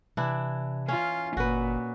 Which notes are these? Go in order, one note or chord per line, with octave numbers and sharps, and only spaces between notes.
C3 E3 D4 E4
C#4 F4
G1 A#2 F#4 B4